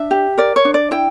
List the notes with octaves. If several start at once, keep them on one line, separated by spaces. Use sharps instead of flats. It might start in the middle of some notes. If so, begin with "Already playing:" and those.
Already playing: D4 E5
G4
A#4 D5
C#5
D4
D5
E4 G5